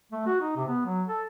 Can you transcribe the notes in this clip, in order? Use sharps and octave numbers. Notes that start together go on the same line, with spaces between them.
A3
F#4
D#4
C3
B3
F#3
A4